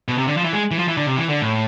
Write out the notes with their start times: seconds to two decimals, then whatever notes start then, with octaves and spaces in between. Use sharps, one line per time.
0.08 B2
0.18 C3
0.27 D3
0.37 F3
0.44 E3
0.53 G#3
0.71 E3
0.79 F3
0.88 E3
0.97 D3
1.06 C3
1.17 E3
1.29 D3
1.41 A2